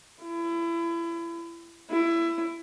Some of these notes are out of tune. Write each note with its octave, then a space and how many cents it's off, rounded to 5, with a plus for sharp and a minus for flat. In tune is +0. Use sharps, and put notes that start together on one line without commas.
E4 +30
E4 +20